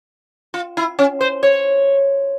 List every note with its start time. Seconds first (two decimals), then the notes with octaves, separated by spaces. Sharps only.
0.54 F4
0.77 E4
0.99 C#4
1.21 C5
1.43 C#5